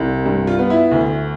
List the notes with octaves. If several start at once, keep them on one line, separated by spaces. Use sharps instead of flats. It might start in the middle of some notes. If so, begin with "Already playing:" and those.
Already playing: C2
G2
F4
B3
E4
D2